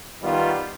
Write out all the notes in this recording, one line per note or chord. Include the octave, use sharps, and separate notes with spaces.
D#3 G3 B3 F4